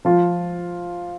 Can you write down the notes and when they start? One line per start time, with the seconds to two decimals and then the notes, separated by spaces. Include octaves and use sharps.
0.05 F3 F4